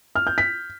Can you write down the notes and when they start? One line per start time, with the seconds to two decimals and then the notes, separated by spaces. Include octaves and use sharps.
0.16 F6
0.27 G6
0.38 B6